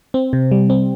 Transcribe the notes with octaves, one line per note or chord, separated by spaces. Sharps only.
C4
C3
G3
C4